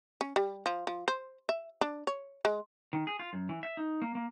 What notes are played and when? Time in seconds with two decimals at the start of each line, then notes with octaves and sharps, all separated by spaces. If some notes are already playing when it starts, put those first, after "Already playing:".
0.21 C#4
0.36 G3
0.66 F3
0.87 F3
1.08 C5
1.49 E5
1.81 D4
2.07 C#5
2.45 G#3
2.93 D#3
3.07 G#4
3.19 F4
3.33 F#2
3.49 E3
3.63 E5
3.77 D#4
4.02 A#3
4.15 A#3